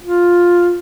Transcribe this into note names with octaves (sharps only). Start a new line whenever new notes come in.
F4